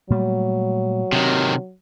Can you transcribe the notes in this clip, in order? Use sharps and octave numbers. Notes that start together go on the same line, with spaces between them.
A#2 F#3 G3 A3
C3 D#3 C4